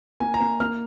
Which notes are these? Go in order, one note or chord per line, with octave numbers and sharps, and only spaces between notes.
A#3 G#5
A#5
A#3
A#3 F6